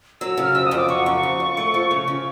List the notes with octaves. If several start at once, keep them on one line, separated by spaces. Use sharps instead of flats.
F#3 E6
C#3 F6
F2 E6
D#6
F2
D6
F#3 C#6
C#3
F2
F2
A3
F3
C#3
C#3